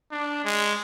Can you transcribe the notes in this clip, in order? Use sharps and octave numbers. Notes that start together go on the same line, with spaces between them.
D4
G#3